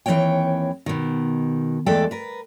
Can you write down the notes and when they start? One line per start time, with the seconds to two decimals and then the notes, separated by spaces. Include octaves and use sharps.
0.06 D#2 E3 A#3 C4 C#5 G5
0.86 B2 D#3
1.86 E2 G#3 A3 A4 D5 G5
2.11 A#4 B4